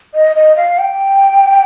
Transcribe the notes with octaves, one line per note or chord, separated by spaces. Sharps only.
D#5
D#5
F5
G5